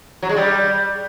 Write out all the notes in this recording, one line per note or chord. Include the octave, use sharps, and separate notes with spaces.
F#3
G#3
G3